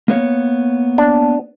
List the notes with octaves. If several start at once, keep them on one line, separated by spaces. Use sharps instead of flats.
A#3 B3 C#5
D4